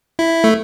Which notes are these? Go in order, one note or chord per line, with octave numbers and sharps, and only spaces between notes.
E4
A3